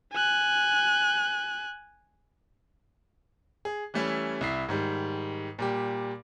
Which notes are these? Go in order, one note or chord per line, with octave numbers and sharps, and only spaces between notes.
G#5 F#6
G#4
E3 G3 A3 C#4 E4
C2 E4 C7
G#2 D#3 G3
A#2 G3 G4